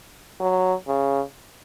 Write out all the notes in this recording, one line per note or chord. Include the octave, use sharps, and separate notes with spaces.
F#3
C#3